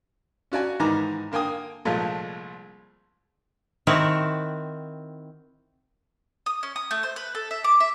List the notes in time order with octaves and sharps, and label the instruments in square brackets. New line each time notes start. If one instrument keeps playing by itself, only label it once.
[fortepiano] C#4 F#4 D5 G#5
G#2 D#3 E3 G#5 A#5 D6
D3 A#3 G5 G#5 D#6
C2 A#2 F3 G#3 A3
[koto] D#3 C4 E4 F#4
[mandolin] D#6
C#4
D#6
A3
C5
B4
A4
E5
D6
E5